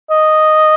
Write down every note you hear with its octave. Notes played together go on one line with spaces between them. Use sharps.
D#5